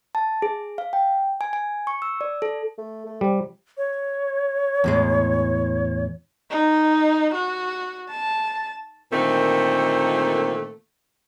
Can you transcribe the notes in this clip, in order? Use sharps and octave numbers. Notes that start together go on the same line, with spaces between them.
A5
G#4
F5
G5
G#5
G#5
C#6
E6
D5
A4
A3
A3
C3 G3
C#5
E2 A2 G#3
D#4
F#4
A5
A#2 D3 D#3 A3 A#3 C4